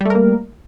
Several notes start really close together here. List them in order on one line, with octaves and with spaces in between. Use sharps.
G3 A3 A#4 A#3